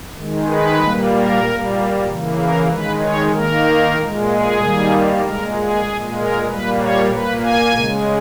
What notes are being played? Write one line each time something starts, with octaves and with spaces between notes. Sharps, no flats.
D#3 G#3
B4
A#2 G3 A#3
A#4
A#2 G3 A#3
C#3 E3 A#3
A#4
D#3 G#3 B4
C#5
D#3 A#3 A#4
A#2
G#3
G#4
D#3 G3 A#3
A#2 G#3 A#4
G#4
A#2 G#3
A#4
A#2 G3 A#3 B4
C#5
A#2 A#3 B4
G#5
C#3 G#3